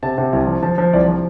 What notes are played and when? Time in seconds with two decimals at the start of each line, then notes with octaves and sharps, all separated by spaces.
0.03 C3 A5
0.18 C3
0.33 C2 A5
0.47 F3
0.63 F3 A5
0.78 F3
0.93 C2 D5
1.08 F3